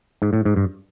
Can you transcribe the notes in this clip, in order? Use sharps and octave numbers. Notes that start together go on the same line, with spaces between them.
G#2
A2
G#2
G2